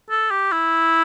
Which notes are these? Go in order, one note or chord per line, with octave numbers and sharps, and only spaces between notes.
A4
G4
E4